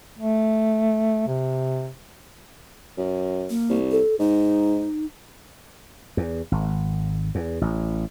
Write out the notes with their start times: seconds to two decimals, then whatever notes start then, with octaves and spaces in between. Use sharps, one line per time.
0.18 A3
1.28 C3
2.98 F#2
3.50 A#3
3.69 C2
3.91 A4
4.19 G#2 D#4
6.17 E2
6.52 G#1
7.35 E2
7.61 A1